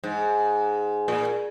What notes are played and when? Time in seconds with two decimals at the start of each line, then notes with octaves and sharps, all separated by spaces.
0.04 G#2
1.08 A#2